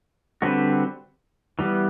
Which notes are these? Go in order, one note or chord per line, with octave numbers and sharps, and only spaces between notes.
D3 G3 C4 F#4 B4
E3 G3 B3